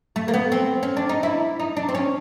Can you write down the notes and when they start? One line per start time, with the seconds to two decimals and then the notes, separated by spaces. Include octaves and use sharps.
0.16 A3
0.28 A#3
0.34 B3
0.52 C4
0.83 C#4
0.97 D4
1.09 D#4
1.23 E4
1.60 D#4
1.77 D4
1.89 C4
1.95 C#4